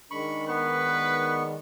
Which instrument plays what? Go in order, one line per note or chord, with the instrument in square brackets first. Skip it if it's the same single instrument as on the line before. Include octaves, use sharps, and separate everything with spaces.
[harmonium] D#3 G#3 D4 [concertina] B5 C#6
[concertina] B3 C#6 [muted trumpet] B4